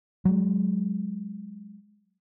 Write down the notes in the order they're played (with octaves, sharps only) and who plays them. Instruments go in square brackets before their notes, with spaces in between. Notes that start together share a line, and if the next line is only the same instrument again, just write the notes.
[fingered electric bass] F#3 G#3